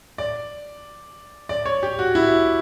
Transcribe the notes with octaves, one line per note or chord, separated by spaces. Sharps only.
D5
D5
C#5
G4
F#4
E4